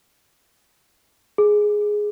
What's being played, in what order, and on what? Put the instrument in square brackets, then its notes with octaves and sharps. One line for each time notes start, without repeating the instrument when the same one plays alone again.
[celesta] G#4